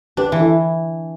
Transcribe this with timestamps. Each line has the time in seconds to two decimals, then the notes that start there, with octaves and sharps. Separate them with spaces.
0.17 D4 G4 B4
0.32 E3
0.40 E4 A4